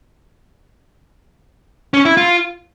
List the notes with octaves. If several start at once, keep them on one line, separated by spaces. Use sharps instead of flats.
C#4
E4
F4